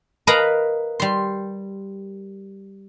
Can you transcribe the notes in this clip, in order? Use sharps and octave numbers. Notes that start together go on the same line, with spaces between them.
A#4 B4 D#5 F5 A#5 B5
G3 C6